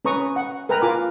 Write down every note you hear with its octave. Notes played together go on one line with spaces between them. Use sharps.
C#4 B4 A#5 C#6 D#6
F#5
A#4 B4 G5 G#5 A#5
F4 G#5 D6